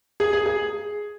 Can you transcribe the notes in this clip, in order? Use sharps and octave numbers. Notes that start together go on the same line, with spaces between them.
G#4
G#4
G#4